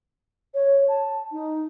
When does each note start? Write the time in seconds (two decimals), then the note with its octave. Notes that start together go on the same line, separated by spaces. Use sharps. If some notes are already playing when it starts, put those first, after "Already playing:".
0.54 C#5
0.88 A5
1.32 D#4